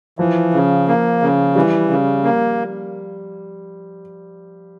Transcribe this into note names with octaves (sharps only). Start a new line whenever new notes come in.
E3 F3
C#3
A#3
C#3
E3 G3
C#3
A#3